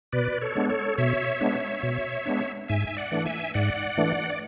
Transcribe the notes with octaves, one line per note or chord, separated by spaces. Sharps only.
B2 B4 D5
A4 C#5
G#3 B3 D4
A4 C#5
B2 C#5 E5
G#3 B3 D4
B2
G#3 B3 D4
G#2 E5 G#5
E5
D5 F#5
E3 A3 D4
E5 G#5
G#2 D5 F#5
E3 A3 D4
D5